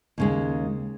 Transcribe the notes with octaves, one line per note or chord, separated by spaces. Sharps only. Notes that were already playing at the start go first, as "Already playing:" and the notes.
D#2 C#3 G#3